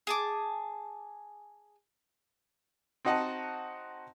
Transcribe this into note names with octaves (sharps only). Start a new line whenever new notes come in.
G#4 A5 D6
C4 D#4 F#4 D#5 F#5 A5